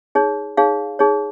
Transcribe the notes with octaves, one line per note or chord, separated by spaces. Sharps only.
D#4 G#4 C#5
D#4 G#4 C#5 F5
D#4 G#4 C#5